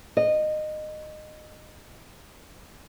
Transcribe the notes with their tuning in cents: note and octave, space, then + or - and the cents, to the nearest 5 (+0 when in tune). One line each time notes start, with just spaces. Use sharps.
D#5 -20